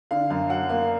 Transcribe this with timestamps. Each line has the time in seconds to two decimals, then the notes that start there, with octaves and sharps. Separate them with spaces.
0.11 D3 F5
0.30 F#2 F5
0.49 F#3 F#5
0.69 A#3 F5